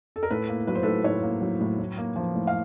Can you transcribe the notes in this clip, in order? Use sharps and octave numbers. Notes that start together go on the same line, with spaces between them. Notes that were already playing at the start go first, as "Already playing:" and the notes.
A4
A#4
A2 A4 B4
A#3
F#3 B4
C5
A2 A4 B4
A2 B4 C#5
A#3
F#3
A2
A2
A#3
F3
A2
F5